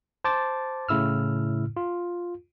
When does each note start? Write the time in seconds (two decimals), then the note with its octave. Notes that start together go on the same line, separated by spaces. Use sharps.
0.24 C5 A5 D6 A6
0.89 A2 C#3 E4 E6 F6
1.77 F4